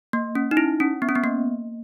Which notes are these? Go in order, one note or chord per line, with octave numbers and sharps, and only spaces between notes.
A#3
C#4
D#4
E4
C#4
B3
C#4
B3
A#3